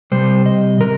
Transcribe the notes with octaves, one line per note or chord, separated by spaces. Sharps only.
C3 G3 C5
D#5
C3 A#4